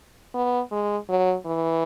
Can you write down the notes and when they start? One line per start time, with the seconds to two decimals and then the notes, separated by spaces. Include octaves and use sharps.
0.34 B3
0.72 G#3
1.09 F#3
1.46 E3